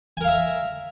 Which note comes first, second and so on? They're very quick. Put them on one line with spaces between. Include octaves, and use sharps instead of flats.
G#5 A#4 F5 E5